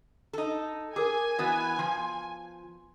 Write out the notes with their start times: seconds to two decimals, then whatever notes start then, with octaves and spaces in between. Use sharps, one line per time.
0.33 D#4 A4
0.96 G#4 A#4 G#5 D6
1.39 E3 B3 F#4
1.79 F3 C6